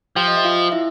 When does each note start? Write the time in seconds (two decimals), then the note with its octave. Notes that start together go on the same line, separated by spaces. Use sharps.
0.16 F3 G4 G5
0.28 D#5
0.37 E5
0.45 F4 F5
0.72 E4 E5